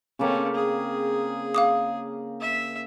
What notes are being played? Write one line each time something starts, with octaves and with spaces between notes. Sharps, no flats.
C#3 A3 A#3 C4 C#4
G#4
F5 D6 D#6
E5